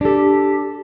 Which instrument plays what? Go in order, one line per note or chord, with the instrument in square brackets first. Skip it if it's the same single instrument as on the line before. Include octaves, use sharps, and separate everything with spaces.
[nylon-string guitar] D4 A4 [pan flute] G4